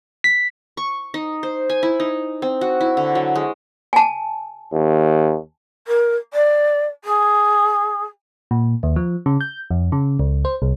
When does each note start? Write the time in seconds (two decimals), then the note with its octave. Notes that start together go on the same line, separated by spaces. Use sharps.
0.24 B6
0.77 C#6
1.14 D#4
1.43 C5
1.70 G#5
1.83 E4
2.00 D#4
2.42 C4
2.61 F#4
2.81 E4
2.97 D3
3.15 F#3
3.35 G#3
3.93 G#5 A5
4.73 D#2
5.87 A#4
6.33 D5
7.04 G#4
8.51 A#2
8.83 D#2
8.96 F3
9.26 C#3
9.41 G6
9.71 F2
9.92 C#3
10.19 C#2
10.45 C5
10.62 C2